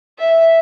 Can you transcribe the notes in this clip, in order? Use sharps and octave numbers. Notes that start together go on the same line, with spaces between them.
E5